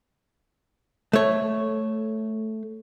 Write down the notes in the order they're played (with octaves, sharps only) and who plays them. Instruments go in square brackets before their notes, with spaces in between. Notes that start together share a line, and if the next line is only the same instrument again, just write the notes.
[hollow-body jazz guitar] A3 C#5